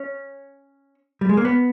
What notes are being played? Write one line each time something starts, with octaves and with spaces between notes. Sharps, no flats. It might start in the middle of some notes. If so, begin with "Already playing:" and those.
Already playing: C#4
G3
G#3
A#3
B3